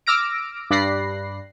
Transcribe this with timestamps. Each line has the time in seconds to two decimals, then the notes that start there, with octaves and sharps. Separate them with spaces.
0.07 D6 E6 F6 A#6 D7
0.71 G2 D5 B5 F#6 A#6 C7